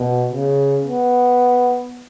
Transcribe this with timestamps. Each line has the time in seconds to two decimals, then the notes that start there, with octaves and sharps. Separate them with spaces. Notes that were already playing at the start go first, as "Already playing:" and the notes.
Already playing: B2
0.32 C#3
0.85 B3